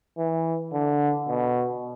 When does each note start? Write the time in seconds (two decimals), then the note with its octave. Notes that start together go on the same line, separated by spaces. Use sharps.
0.18 E3
0.72 D3
1.28 B2